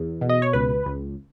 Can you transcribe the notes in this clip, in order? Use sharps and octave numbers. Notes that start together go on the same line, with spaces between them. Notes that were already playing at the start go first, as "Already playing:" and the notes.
Already playing: E2
B2
D#5
C#5
C#2 B4
C#2